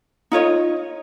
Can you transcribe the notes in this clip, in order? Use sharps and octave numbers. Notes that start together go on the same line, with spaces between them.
D#4 F4 C#5 D#5